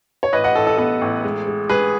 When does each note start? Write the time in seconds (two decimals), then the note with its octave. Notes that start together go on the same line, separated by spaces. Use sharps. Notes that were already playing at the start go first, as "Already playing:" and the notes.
0.23 C#5
0.33 A1 B4 D#5
0.44 D#5 F#5
0.55 A1 A4
0.67 A4
0.78 B3 A4
1.01 A1
1.24 G#3
1.47 G#3
1.69 G#3 G#4 B4